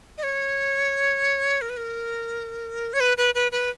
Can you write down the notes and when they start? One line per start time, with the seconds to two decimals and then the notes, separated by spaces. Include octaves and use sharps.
0.18 D#5
0.23 C#5
1.61 A#4
1.69 B4
1.77 A#4
2.93 C#5
3.00 B4
3.18 B4
3.35 B4
3.52 B4